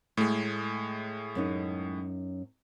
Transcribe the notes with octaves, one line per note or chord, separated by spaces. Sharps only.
A2 G#3 A3
F#2 C#4 D#4